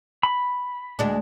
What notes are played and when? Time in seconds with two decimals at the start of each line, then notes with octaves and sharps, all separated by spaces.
0.23 B5
0.99 D2 G#3 D4